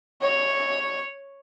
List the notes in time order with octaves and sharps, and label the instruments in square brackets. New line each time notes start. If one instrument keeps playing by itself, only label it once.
[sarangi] C#5